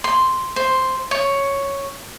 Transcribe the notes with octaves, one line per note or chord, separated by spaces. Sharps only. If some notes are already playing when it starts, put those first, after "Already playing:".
C6
C5
C#5